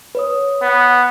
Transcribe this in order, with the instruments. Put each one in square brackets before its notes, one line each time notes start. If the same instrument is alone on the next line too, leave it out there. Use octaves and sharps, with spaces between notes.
[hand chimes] B4 C#5 D#6
[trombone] B3